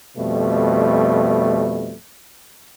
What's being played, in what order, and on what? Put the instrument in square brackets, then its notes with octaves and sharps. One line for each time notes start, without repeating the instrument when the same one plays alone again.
[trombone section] F2 B2 G3 A3